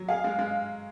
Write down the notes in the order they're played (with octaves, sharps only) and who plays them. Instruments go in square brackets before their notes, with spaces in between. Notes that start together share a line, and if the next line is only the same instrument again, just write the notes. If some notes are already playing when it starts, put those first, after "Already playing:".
Already playing: [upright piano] F#3
[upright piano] G#4 [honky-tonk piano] F5
[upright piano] G#3
G#3